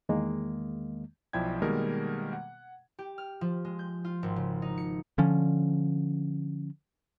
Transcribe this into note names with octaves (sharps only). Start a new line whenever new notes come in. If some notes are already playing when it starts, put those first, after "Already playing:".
E2 D#3 G#3 A#3
B1 F3 E4 D5 G5 G#6
B2 D#3 G3 G#3 A#3 A#4
F#5
G4
F6
F3
G#3
G6
F4
G#1
C#3
D#4
C#7
D3 F3 C#4